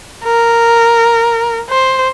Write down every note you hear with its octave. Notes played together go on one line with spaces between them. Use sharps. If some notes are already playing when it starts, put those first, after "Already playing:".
A#4
C5